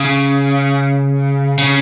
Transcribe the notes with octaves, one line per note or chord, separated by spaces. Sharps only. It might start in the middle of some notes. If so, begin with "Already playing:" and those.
Already playing: C#3
C#3